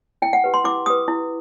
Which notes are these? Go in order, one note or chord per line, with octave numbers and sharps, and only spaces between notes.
E4 G5
F#5
G4 B4
C6
E4 D6
G4 B4 D#6
E4